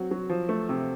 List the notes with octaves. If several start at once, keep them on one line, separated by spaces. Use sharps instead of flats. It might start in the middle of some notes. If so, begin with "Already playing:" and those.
Already playing: F#3 C4 F#4
F#3
F3
A3
C3